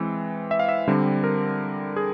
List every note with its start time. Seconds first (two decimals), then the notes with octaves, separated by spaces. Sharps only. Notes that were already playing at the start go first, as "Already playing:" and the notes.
Already playing: E3 G#3 C4
0.51 E5
0.59 F5
0.69 E5
0.88 D3 G3 C4
1.24 A#4
1.96 G#4